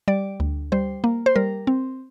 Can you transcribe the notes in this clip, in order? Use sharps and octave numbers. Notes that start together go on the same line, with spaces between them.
G3 D5
D2
G3 C5
A#3
C5
G3 A#4
C4